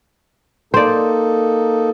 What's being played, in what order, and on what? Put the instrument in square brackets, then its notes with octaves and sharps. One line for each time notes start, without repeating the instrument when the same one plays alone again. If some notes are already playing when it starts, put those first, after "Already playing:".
[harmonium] A#3 D#4 A4 [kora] C5 D5